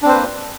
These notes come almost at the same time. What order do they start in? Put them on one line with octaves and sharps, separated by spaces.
D4 C4 C5 B4 A#3